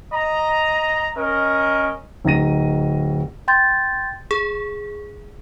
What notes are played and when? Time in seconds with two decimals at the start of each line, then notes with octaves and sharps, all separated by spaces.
0.13 D#5 A#5
1.17 C#4 A#4 D#5
2.25 D1 D#4 D#5 A#6 D#7
3.48 G5 C6 G6 A6
4.31 G#4